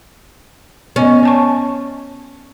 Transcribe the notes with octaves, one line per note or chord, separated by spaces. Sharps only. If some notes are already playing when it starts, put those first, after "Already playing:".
B3 C#4 D#5
C#5 A5 C#6